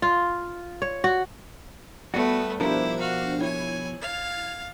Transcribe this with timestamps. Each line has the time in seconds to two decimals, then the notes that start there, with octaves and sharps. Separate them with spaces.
0.02 F4
0.82 C#5
1.04 F#4
2.14 G3 A3 B3 F#4 B4
2.60 B2 F3 D4 E4 G4 A#4 C5
2.99 F#4 F5
3.40 E4 C#5 G#5
4.01 F5 G#6 A6 F7